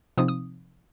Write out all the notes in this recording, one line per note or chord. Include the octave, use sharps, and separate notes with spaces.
C3 F3 C4 D#4 D#6
D#6